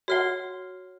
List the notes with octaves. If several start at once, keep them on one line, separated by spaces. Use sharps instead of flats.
F#4 C#5 F#5 F6 G7